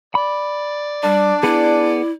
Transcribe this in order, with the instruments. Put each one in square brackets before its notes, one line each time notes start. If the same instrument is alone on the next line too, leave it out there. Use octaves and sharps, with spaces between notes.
[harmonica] D5 [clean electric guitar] B5
[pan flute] G3 [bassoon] D4
[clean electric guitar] B3 G#4 [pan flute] E4